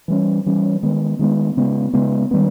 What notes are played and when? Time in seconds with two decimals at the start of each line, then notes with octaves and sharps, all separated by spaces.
0.08 E3 G3 C#4
0.46 E3 G3 C#4
0.83 D#3 G#3 B3
1.19 D#3 G#3 B3
1.57 C#3 G#3 B3
1.93 C#3 G#3 B3
2.31 D#3 G3 B3